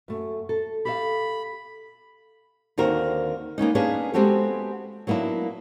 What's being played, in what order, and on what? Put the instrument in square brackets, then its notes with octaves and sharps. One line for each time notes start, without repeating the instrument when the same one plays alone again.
[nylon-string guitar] F#2 A3
A4
[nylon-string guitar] G4 A4 F5 [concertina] B5
[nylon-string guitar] D#2 D3 C4 F#4 A#4
A#3 B3 C#4 D#4
A#3 B3 C#4 D4 G#4 B4
G#3 B3 C4 F#4 G4 A4
F#3 A#3 B3 D4 E4